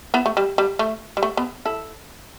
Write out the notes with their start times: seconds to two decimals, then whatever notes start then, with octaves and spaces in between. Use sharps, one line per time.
0.14 B3 E4
0.26 A3
0.37 G3
0.58 G3
0.79 A3
1.17 G3
1.23 A3
1.37 B3
1.65 E4 A4